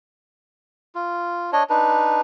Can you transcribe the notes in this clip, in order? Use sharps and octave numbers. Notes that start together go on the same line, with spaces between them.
F4
D4 C#5 D#5
D4 D#4 B4